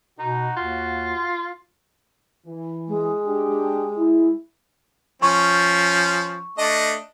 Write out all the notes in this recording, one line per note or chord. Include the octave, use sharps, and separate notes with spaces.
B2 D#4 F#4
D#2 F4
E3
G#3
D4 G4
E4
F3 C#4 C#6
A3 D4 D#5